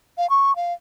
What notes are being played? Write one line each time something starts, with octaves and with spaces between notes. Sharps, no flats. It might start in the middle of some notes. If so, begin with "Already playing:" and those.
F5
C#6
F5